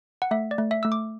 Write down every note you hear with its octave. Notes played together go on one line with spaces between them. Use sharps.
F#5
A3 E5
D5
A3
E5
A3 E6
D6